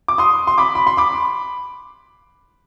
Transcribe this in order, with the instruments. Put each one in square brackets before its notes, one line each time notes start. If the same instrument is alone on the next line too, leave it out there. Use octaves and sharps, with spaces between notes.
[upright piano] D6
C6 D#6
C6
B5 D6
B5
C6
B5 D6